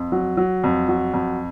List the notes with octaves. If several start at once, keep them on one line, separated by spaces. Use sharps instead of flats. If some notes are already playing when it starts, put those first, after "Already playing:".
Already playing: F2
F#3
F#3
F2
F#3
F2